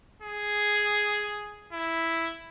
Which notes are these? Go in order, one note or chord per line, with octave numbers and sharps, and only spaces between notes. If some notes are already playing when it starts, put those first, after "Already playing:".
G#4
E4